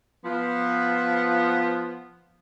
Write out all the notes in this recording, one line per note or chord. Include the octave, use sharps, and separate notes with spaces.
F3 B3